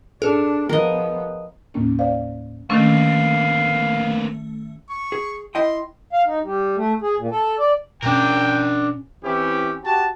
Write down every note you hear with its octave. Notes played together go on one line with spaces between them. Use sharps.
D4 G#4 A4
F3 B3 A#4 D#5
D#2 A2 C#3 A#3 C#4 D#4
C5 D5 F5
D#3 A3 A#3 C4 C#4 F5
C#6
G#4
E4 D#5 G5 C6
F5
D#4
G3
A3
G#4
A#2
A4
D5
B2 C#4 D4 A#4 G5
E3 C4 C#4 E4 G4
F#4 G4 A5